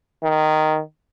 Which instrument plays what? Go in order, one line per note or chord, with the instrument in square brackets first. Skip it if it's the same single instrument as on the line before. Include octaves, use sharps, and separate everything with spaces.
[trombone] D#3